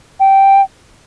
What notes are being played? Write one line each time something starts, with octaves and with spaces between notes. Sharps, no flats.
G5